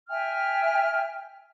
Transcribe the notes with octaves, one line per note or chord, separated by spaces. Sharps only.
E5 G5 G#5 F6